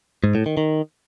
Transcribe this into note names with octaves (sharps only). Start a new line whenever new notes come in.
G#2
A2
D#3
D#3